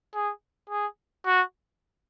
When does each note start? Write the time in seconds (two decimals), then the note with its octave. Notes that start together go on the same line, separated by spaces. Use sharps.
0.15 G#4
0.70 G#4
1.26 F#4